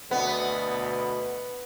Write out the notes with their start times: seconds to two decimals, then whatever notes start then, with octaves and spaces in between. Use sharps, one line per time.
0.11 D2 B2 B3